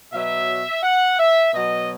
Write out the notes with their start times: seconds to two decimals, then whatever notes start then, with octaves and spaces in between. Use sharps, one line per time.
0.13 B2 F#3 E5
0.83 F#5
1.19 E5
1.53 B2 F#3 D#5